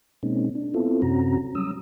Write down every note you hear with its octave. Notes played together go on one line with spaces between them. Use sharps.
B2 G#3 A#3 C4 C#4 D#4
D4
B3 C4 E4 F4 A4
F#2 C3 C4 C#4 F#4 A#5
F#3 G3 C#4 D#6 E6